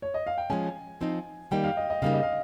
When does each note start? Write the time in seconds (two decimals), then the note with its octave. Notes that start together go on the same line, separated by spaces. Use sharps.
0.02 C#5
0.14 D#5
0.27 F5
0.38 G5
0.50 F3 G#3 C#4 G#5
1.01 F3 C4 D#4
1.51 D#3 G3 A#3 D#4 G5
1.64 F5
1.77 D#5
1.90 D#5
2.02 C#3 G3 A#3 D#4 F5
2.13 D#5
2.23 F5